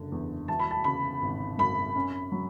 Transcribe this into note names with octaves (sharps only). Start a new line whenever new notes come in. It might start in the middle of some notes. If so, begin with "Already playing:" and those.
Already playing: F#1 D3
E2
E3 A5
B5
A5
C#3 B5
G#1
F#2 B5
C#4
F#3